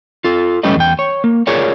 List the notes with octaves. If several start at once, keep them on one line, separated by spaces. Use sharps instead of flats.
F4 A4
G3 A3 C#4 G4 B4 D#5
E2 G5
C#5
A#3
F4 G#4 A#4 C#5 D5